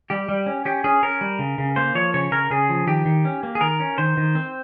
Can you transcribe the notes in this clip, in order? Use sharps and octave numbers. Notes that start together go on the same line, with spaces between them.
G3 G4
G3
C#4
C#4 G4
C#4 G#4
C#4 A#4
G3
C#3
C#3
A#3 C5
F3 C#5
C#3 C#5
C#3 A#4
C#3 G#4
F3
D#3 G4
D#3
C#4
A#3
G#4
D#3 A#4
C#4
D#3 C5
D#3
C4